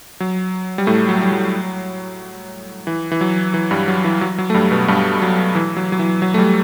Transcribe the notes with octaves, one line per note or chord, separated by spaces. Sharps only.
F#3
G3
A2 A3
F#3
G3
F#3
E3
E3
F#3
E3
G2 G3
F#3
E3
F#3
F#3
A3
G2 G3
B2 B3
G2 G3
F#3
E3
F#3
F#3
E3
F#3
A3
G3